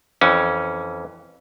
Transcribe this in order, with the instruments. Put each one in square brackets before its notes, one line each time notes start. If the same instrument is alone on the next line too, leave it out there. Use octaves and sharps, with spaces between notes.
[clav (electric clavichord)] F2 E3 C#4